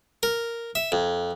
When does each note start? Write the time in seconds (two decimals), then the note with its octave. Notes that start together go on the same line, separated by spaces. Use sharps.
0.23 A#4
0.75 E5
0.92 F2